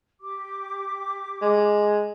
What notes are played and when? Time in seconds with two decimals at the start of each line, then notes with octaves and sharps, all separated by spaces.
0.21 G4 D6
1.42 G#3